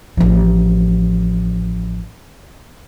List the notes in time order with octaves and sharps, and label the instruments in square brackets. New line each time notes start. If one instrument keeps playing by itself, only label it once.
[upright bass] A1 F3